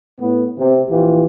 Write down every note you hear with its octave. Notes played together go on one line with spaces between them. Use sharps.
A2 B3
C3
A#1 E3 F4 G4